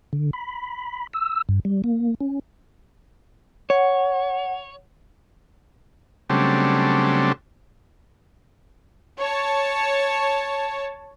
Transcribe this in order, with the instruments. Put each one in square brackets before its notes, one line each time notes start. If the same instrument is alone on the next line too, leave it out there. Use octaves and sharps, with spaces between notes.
[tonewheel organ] D3
B5
E6
G2
G3
A#3
C#4
[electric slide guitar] C#5 [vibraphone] F#5
[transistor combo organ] C#3 F#3 G3 A3 C4 D4
[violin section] C#5 A5